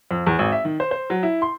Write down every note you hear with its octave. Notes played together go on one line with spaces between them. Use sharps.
F2
E2
G#1
E5
D#3
C5
C5
F#3
E4
C6